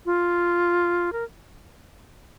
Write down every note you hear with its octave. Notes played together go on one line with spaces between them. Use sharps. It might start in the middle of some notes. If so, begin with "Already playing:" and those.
F4
A#4